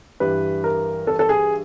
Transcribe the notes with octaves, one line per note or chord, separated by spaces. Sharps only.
G2 E3 G3 B4
A#4
A4
A4
G#4